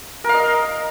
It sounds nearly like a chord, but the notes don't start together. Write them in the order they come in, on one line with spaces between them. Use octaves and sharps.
A#4 F5 D#5